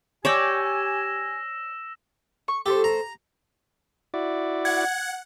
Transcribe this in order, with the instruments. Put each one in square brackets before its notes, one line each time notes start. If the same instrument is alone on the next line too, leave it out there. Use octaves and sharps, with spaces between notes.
[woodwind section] G4 G#5 [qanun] C#5 D5 G5 [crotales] E6 A#6 E7
[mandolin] C#6
[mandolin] A3 A4 C5 [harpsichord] G4
[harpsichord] A#5
[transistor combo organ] E4 F#4 D5
[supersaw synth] F#5 [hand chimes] G#6